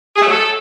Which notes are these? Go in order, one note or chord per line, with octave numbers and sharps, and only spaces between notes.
G#4
A3
F#3
A4